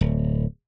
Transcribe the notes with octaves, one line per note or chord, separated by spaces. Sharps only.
D1